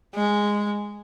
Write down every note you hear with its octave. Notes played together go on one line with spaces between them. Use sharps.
G#3